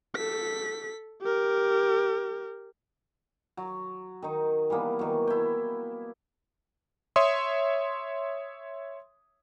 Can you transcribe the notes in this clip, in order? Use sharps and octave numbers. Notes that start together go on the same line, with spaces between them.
A4 B6
G4 A#4
F#3
D#3 D#4
E3 G3 A#3 B3
D#3 F#3
E4 G5
C#5 E5 C6 D#6